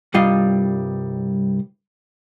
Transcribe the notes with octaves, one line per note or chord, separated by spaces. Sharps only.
C2 G2 G3 F4 D#5 F5